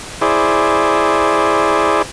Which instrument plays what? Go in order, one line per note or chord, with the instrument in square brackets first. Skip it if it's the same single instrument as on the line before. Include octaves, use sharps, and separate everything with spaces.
[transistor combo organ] E4 G#4 C5 D5